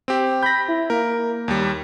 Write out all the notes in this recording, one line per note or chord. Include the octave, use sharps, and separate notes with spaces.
C4 G4
B5 G6 A#6
E4
A#3 A#4
D#2 G3